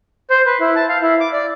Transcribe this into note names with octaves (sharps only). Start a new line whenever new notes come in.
C5
B4
E4
A5
F5
E4
D6
D5